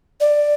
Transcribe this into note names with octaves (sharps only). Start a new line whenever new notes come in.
D5